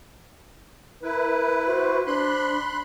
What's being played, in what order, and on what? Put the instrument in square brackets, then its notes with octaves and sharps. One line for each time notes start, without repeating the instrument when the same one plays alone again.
[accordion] E4 B4 [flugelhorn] A#4
[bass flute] F#4 [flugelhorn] C5
[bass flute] D4 [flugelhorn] C5 [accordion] B5 C6 F#6